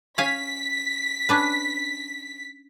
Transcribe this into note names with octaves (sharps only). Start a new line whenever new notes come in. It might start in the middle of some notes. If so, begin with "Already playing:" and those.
C#4 F5 G#5 B6
C#4 D4 B4